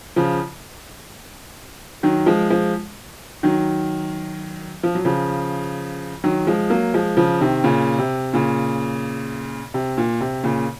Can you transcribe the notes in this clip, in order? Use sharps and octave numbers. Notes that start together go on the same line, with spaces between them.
C#3 F3
D#3 F#3
F3 G#3
F3 G#3
D#3 F#3
F3
F#3
C#3 F3
D#3 F#3
F3 G#3
F#3 A#3
F3 G#3
C#3 F3
C3 D#3
A#2 C#3
C3
A#2 C#3
C3
A#2
C3
A#2 C#3